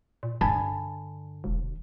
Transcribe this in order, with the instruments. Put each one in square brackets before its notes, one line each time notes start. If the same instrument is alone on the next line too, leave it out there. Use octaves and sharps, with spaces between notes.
[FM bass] A#2
[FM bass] G2 [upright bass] D3 [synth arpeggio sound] G#5 A5 B5
[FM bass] E1